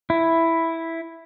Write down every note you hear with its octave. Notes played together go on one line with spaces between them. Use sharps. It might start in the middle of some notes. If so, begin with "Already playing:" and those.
E4